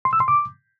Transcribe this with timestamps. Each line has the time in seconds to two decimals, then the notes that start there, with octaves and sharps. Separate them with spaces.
0.05 C6
0.13 E6
0.20 C6
0.28 D6